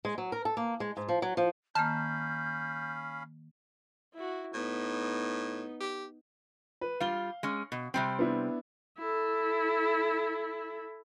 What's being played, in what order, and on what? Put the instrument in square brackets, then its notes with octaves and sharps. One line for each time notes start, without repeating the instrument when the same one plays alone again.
[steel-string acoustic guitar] G#3
F#3
A#4
A4
A#3
G#3
G#2
F3
F#3
F3
[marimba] D#3 A#3 [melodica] C#4 F5 B5 [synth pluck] A5 F6 [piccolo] G6
[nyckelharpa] E4 F#4
[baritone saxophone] A2 [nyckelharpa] B3 D#4
[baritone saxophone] G4
[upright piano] B4
[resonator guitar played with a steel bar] G3 F4 [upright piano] F5 G7
[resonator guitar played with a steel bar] G#3 C#4
B2
[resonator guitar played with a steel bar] C3 G3 C4 [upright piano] G5
[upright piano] B3 D4 E4
[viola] E4 A4